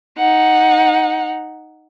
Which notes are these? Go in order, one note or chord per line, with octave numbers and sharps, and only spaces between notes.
D#4 F#5